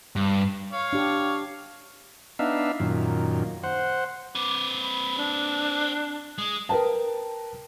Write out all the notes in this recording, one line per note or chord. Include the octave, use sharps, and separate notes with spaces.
G2
C#5 F5
D4 G4
B3 D4 D#4 E5 F5
F#2 A#2 D#3
C5 F#5
C4 B4 D6
B5
D4
G#3 D#6
A#4 B4 G5 A5